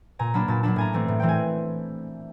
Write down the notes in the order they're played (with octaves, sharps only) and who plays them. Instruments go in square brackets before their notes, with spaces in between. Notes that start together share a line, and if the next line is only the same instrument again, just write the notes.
[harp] A#2 G#5 A#5
F#3 A#3 D4 A5 B5
A#2 A5 B5
F#3 A#3 D4 A5 B5
A2 G#5 A#5
E3 A3 C4
A2
E3 A3 C4 G5
G#5